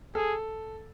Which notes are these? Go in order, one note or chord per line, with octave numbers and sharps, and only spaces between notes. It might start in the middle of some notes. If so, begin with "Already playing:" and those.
G#4 A4